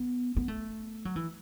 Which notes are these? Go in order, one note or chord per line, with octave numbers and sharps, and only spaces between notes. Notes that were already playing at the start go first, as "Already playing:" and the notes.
Already playing: B3
B3
A3
F#3
E3